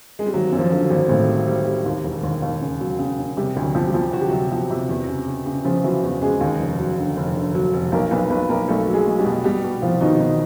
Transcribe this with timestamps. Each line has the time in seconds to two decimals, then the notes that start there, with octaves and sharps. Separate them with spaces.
0.19 G#3
0.26 G3
0.34 G#1 F#3
0.52 F#2
0.59 F3
0.71 D3
0.84 F#3
0.90 G#1
1.09 G#1 A2 A3
1.28 G3
1.47 G3
1.66 G3
1.85 D#2
2.04 E1
2.23 D#2
2.42 D#2
2.61 C#3
2.80 F#3
2.99 C#3
3.19 C#3
3.37 C3 G3 G4
3.56 D2
3.63 F#3 F#4
3.75 F3
3.88 G3 G4
3.94 F3
4.13 D2 F#4
4.21 G4
4.29 C3 F#3 F#4
4.51 F3
4.71 C3
4.89 E2
5.08 C#3
5.27 C#3
5.46 C#3
5.64 C#3 F3 F4
5.83 E3 F#3 F#4
6.03 E2
6.21 C#3 G#3 G#4
6.41 D#2
6.60 F1
6.79 F#3
6.98 D3
7.17 F1
7.35 D3
7.55 F#3
7.73 F1
7.92 B1 A#3 A#4
8.11 B1 B3 B4
8.30 B1 B3 B4
8.49 B1 A#3 A#4
8.68 B1 A3 A4
8.87 F#3
8.94 G#3 G#4
9.06 F#3
9.19 G3 G4
9.25 B2
9.44 B2 G3 G4
9.64 B2
9.82 C2 F3 F4
10.01 B2 D#3 D#4
10.20 B2 D#3 D#4